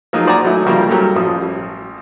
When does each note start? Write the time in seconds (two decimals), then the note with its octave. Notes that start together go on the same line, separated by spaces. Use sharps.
0.13 F3 F#3 A#3 D#4 F4 G#4
0.27 C5 D5 F#5 G#5 A#5
0.45 F#3 A3 D#4 E4
0.66 C#3 F3 G3 A#3 A#4
0.89 F#3 G3 A4 A#4
1.16 A1 F3 D#6